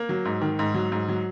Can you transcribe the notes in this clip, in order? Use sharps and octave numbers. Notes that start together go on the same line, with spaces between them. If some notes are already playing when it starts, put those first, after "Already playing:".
Already playing: A#3
F#3
G#2
D#3
G#2
F#3
G#2
F#3